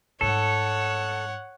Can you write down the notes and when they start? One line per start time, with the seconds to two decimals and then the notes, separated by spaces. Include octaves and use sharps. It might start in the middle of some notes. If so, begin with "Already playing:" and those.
0.21 G#2 G3 A4 C#5 F#5